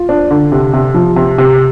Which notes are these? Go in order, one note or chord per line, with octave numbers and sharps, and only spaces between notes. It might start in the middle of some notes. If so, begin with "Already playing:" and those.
Already playing: F4
D4
D3
C3
C3
F3
C3
C3